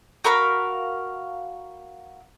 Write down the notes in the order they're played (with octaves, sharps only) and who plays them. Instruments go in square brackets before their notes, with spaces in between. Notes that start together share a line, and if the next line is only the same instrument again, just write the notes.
[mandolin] F#4 A#4 F5 B5